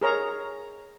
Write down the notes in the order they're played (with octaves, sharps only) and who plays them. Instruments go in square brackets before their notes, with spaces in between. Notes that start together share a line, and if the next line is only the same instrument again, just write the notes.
[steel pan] G#4 A#4 C#5 A#5